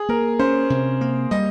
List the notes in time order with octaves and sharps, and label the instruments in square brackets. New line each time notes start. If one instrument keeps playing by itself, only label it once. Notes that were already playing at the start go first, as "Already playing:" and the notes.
Already playing: [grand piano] G#4
[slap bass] A#3 [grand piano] A#4
[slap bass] C#4 [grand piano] C5
[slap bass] C3
A#3
[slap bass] G3 [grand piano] D#5